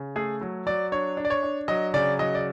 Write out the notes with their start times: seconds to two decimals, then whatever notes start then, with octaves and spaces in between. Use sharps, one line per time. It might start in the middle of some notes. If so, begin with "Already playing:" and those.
Already playing: C#3
0.16 A3 G#4
0.41 F#3
0.66 F#3 D5
0.92 D4 C#5
1.17 D4
1.25 D5
1.30 C#5
1.43 D4
1.68 F#3 D#5
1.94 C#3 D5
2.19 F#3 D#5
2.35 D5